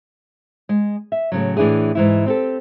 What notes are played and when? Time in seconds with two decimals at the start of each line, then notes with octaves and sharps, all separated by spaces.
0.69 G#3
1.12 E5
1.32 A2 C#3 F#3
1.57 A2 E3 D4 E4 G#4
1.95 G#2 E3 E4
2.26 C4 G4 A4